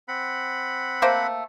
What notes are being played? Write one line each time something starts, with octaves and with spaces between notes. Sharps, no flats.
C4 F#5 B5
A3 A#3 C5